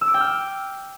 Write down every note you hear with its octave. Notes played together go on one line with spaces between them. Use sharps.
E6
D6
G5
F6